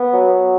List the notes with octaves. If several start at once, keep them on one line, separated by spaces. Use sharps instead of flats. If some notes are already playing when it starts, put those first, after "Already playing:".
Already playing: B3
F#3